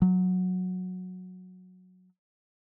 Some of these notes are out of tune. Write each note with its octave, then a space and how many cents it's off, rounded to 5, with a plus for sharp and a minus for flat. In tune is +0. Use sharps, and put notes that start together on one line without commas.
F#3 -10